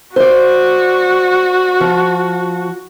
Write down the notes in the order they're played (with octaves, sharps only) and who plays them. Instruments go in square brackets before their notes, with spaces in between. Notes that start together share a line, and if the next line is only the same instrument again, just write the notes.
[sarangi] F#4 [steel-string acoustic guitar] C5 D5
[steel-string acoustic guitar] F3